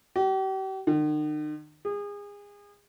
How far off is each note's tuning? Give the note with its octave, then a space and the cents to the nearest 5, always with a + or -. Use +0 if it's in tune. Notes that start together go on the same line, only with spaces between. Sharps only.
G4 -40
D#3 -45
G#4 -30